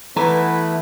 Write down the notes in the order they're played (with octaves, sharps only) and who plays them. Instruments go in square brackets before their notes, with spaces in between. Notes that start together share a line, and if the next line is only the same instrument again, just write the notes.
[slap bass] E3 [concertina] A3 E4 B4 [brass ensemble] B3 [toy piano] A4 A#5 D6